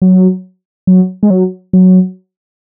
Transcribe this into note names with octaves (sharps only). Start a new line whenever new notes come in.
F#3
F#3
G#3
F#3
F#3